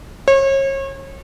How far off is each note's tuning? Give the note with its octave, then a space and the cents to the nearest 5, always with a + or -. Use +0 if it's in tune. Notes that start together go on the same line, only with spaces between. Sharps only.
C#5 -35